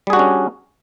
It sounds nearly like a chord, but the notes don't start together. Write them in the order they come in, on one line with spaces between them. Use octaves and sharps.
G3 G#4 F#4 D4 C#4